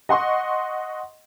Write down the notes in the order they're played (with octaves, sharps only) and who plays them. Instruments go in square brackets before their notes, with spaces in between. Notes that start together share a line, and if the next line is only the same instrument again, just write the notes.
[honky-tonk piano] D#5 F#5 C6 C#6